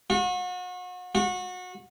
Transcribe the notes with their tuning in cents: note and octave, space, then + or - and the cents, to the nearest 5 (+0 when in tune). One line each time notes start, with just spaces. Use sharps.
F#4 -35
F#4 -25